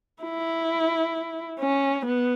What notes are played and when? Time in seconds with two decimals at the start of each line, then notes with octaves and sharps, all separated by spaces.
0.23 E4
1.60 C#4
2.05 B3